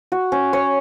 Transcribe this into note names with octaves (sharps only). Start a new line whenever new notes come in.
F#4
C#4
C#5